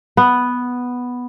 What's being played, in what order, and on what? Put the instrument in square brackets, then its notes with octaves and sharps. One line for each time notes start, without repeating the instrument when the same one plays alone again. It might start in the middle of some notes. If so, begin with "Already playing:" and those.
[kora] B3